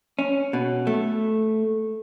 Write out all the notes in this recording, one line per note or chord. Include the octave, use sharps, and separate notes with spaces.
C#4
B2
A3